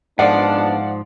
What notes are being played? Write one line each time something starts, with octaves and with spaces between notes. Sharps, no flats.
A#1 G#2 F3 B3 D4 D5 F5 F#5